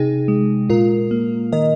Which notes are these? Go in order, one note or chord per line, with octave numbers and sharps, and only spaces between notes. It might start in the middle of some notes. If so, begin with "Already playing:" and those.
Already playing: C3 D#4 G#4
G#3
A#2 F4 A#4
A#3
D#3 A#4 D#5